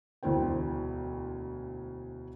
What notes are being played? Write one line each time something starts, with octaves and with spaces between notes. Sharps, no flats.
E1 D2 E4 C5 G5